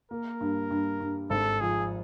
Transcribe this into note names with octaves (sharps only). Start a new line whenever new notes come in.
A#3 A#4
G2
G2
G2
G#1 A4
F3 G#4